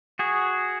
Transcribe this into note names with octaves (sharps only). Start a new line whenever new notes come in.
F#4 G#4